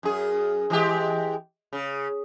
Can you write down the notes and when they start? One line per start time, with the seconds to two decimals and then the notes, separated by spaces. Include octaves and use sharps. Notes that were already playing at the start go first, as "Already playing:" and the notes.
0.03 F#2 G#4
0.70 E3 G#3 G4
1.73 C#3